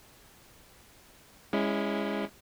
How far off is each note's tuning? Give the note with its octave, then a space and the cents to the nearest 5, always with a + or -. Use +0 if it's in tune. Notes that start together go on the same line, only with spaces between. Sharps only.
G#3 -20 C#4 +0 E4 +0